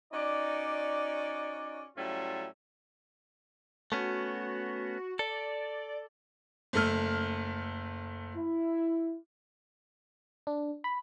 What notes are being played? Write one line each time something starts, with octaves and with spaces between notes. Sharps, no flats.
C#4 D#4 F#4 D5
A2 F#3 G3 C#4 F4 E5
A3 B3 C#4 F#4
A4 D5
F#1 A3 F6
E4
D4
B5